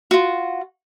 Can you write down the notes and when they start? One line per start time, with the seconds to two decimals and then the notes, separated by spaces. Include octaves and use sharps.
0.11 F4 F#4